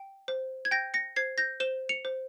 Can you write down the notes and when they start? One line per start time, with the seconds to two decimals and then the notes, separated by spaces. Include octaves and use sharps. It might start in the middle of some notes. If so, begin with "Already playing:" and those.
Already playing: G5
0.28 C5
0.65 G#6
0.71 G5 G6 A#6
0.94 A#6 C#7
1.16 C5 G#6 C7
1.38 G6 A#6
1.60 C5 E7 G7
1.89 C#7 F7
2.05 C5